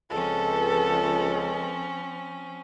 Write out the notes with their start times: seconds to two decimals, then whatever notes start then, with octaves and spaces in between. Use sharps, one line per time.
0.11 C#2 F3 C4 C#4 A4